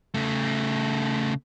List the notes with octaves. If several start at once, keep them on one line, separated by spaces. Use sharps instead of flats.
C#3 A3